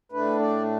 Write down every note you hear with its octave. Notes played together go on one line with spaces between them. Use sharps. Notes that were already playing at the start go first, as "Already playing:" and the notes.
A2 A3 D4 B4
D5